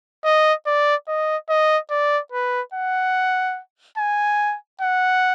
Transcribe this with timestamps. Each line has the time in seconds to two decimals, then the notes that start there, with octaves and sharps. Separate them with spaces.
0.24 D#5
0.66 D5
1.08 D#5
1.49 D#5
1.91 D5
2.32 B4
2.73 F#5
3.98 G#5
4.81 F#5